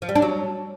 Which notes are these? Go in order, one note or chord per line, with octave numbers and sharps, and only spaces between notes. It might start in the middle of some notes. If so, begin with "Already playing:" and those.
F3
G3
D4
F#3